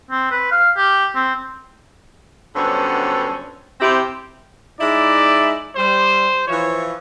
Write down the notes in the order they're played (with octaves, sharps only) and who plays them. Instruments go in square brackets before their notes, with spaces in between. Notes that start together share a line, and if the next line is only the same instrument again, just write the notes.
[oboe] C4
B4
F5
G4
C4
[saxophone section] G2 D3 F#3 B3 C#4 C5
C3 C4 E4 G4
[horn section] G#3 D#4 E4 [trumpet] D5
[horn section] G3 [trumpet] C5
[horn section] E3 F3 [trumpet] C#5